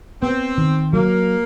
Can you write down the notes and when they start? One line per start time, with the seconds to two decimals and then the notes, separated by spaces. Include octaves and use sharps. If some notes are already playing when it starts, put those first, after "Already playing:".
0.22 B3 C4
0.58 D#3
0.93 F#3 A#3